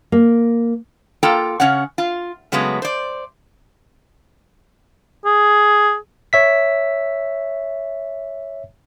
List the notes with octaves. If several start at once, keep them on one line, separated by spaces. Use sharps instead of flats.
A#3
A#3 F4 A4 G5 A#5
C#3 C#4 C#5 F#5
F4
C#3 F#3 G#3 A3 B3
C5 D5
G#4
C#5 E5 B6